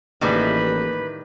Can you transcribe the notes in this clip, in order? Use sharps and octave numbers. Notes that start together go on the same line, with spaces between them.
A1 A2 D#3 G3 A#3 E4 G#4 B4